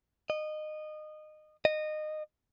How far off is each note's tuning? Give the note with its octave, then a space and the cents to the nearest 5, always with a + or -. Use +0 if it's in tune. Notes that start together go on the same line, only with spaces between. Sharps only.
D#5 -20
D#5 -20